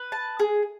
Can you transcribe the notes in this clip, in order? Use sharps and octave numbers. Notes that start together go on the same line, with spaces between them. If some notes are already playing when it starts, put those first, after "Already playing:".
Already playing: B4
A5
G#4